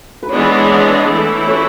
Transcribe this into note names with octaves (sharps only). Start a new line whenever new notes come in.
B4
E3 G#3 B3 D4 C#5
E3 A3 E4
B4 C#5